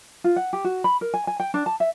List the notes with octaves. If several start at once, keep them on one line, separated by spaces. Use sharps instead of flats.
F4
F#5
G4
F#4
B5
A#4
G#5
G#5
G5
D4
A5
E5